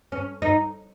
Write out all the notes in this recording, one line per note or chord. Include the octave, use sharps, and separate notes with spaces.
C#4
D#4